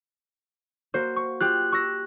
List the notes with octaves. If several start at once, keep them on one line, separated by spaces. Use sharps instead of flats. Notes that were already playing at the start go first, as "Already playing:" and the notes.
A#3 F#4 C5
C#6
F4 G4 G5 F#6
C#6 E6 A#6